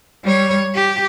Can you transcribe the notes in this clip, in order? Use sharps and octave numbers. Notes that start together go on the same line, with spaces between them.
G3 C#5
G4